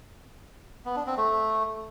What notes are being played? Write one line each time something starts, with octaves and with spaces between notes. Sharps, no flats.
B3
D4
C4
A3